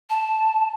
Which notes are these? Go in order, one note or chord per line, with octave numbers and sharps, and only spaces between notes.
A5